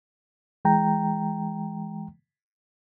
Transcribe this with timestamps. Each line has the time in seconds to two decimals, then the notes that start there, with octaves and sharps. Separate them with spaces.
0.65 E3 G#3 G5 A#5